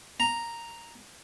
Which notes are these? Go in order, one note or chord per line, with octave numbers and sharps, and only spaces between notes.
A#5